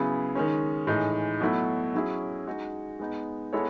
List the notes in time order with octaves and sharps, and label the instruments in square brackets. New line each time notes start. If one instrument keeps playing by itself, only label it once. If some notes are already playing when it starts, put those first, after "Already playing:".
Already playing: [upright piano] C#3 F#3 B3 E4 G#4
D#3 G#3 C#4
A2 E3 G#3 D#4
B2 F#3 A3 E4
F#3 C#4 E4 G#4
G#3 D#4 F#4
G#3 B3 D#4
G#3 B3 E4 A4 C#5